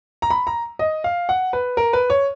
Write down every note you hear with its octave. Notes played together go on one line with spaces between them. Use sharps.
A#5
B5
A#5
D#5
F5
F#5
B4
A#4
B4
C#5